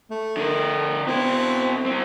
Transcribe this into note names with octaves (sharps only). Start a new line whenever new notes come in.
A3
D3 A#4
B2 C4 E4
C4 E4